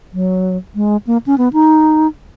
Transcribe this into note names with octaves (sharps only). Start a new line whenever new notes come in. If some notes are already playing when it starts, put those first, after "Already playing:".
F#3
G#3
A#3
C#4
B3
D#4